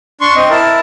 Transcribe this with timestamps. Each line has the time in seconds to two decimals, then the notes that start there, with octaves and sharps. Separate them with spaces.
0.21 D4 C6 C#6
0.36 C4 D#5
0.50 E4 A#4 A5